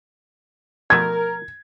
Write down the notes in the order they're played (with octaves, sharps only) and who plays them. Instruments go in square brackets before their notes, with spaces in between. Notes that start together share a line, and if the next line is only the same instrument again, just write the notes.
[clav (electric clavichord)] B2 F3 A3 [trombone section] A#4 [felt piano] G#6